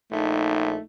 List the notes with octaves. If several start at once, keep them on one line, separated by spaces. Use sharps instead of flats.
A#1 A3 D#4